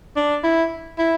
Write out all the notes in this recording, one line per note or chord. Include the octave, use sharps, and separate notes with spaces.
D4
E4
E4